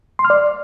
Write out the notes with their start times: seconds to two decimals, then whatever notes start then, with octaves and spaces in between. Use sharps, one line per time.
0.19 C6
0.25 F6
0.30 D5